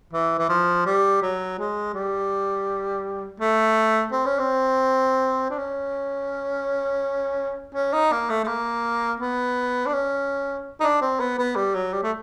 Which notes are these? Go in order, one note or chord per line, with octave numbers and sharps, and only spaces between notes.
E3
E3
F3
G3
F#3
G#3
G3
A3
C4
C#4
C4
D4
C#4
C#4
D#4
A#3
A3
A3
A#3
B3
D4
C#4
D#4
D4
C4
B3
B3
G3
F#3
G3
A3